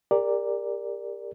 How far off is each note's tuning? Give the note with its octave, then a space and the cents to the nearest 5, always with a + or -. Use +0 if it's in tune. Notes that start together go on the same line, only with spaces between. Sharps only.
G4 +35 A#4 +0 D5 +0